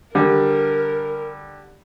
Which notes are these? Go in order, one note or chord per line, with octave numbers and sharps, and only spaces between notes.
D3 G3 A#4